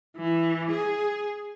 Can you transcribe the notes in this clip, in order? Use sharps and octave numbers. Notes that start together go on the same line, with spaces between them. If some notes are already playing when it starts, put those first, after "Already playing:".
E3
G#4